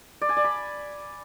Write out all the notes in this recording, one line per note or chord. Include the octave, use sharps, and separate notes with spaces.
D5
G#5
D5
B5